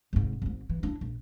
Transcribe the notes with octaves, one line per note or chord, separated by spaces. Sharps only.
F1 G#2
G#1 G#2
E3
D4 E4
A#1